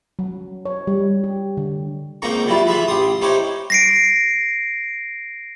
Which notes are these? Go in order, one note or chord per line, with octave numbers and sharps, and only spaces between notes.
F#3
C#5
G3
G4
D3
C#2 A#3 C4 D#4 A#5 C#6
F#3 G3 E4 F4
E3 F4 G#4 E5 B5
A1 G4 C6 D#6
C#4 D#4 E4 G4 C5 C#5
A#6 C7 D7